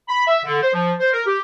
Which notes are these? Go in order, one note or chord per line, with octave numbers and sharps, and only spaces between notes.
B5
E5
D3
C5
F3
C5
A#4
G4